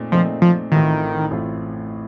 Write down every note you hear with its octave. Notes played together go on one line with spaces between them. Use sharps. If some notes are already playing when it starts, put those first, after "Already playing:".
Already playing: A#2 A3 C4 D#4
A#2 F3 A3 C4 D#4
F3
A1 A2 D#3 A3 C4 F4
A1 A2 A3 C4 F4